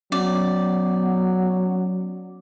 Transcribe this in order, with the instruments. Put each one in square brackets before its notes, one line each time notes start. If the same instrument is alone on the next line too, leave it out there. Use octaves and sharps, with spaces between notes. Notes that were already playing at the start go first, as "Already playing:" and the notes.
[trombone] F#3 [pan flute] B3 [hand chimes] C#4 [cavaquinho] D5